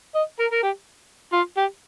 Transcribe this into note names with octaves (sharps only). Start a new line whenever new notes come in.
D#5
A#4
A#4
G4
F4
G4